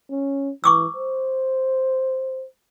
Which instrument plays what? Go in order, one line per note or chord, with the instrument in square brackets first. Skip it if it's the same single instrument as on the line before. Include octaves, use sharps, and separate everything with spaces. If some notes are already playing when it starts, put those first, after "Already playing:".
[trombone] C#4
[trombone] E3 [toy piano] C#6 D6 E6
[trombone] C5